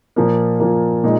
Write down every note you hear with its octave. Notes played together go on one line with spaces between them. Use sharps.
A#2 F3 A#3
A#2 F3 A#3
A#2 G#3 D#4